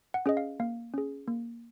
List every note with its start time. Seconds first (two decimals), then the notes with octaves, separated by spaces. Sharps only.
0.14 F#5
0.26 C#4 G#4 D#5
0.37 F5
0.60 A#3 F5
0.94 C#4 G#4
1.28 A#3